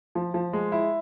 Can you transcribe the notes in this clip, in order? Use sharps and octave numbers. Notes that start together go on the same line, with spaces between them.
F3
F3
G#3
E4